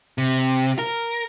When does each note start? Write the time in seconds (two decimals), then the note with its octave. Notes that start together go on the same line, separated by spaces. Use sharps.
0.18 C3
0.79 A#4